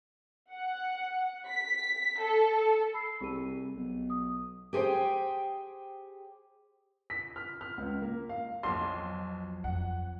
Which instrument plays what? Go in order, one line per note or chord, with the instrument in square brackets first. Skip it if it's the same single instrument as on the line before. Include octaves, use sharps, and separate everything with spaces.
[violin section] F#5
B6
A4
[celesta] B5 E6 C7
[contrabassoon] C2 [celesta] G#4 D#7
[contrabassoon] B1
[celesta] D#6
[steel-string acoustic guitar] G4 G#4 C5 G5
[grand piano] B6
F6
F6
C#2
A#3
F5
[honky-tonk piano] B1 [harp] F2 F#3 [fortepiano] C6
[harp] B3
[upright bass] F2 [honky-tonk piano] F#5